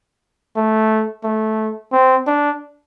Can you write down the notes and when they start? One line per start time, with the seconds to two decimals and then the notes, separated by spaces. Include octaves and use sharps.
0.57 A3
1.24 A3
1.93 C4
2.27 D4